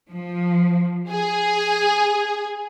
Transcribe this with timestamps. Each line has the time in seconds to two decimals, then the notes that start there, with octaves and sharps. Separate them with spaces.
0.12 F3
1.10 G#4